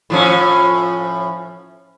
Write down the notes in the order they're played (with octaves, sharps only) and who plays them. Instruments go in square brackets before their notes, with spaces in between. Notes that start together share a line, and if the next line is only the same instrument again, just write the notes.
[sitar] A2 F3 C#4